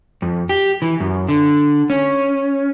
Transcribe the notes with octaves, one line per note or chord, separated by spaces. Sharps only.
F2
G4
E3
F#2
D3
C#4